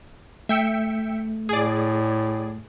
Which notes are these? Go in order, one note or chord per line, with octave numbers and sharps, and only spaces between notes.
A3 E5 G5 C#7
A2 G#4 D5